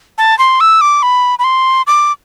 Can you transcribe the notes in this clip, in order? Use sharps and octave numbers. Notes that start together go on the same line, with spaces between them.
A5
C6
E6
D6
B5
B5
C6
D6